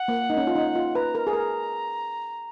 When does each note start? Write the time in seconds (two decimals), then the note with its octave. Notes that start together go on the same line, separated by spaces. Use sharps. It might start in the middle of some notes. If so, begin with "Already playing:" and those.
Already playing: F#5
0.08 A#3
0.30 D#4
0.37 C#4
0.47 F4
0.55 D#4
0.75 F4
0.95 B4 A#5
1.15 A#4
1.27 G#4
1.33 A#4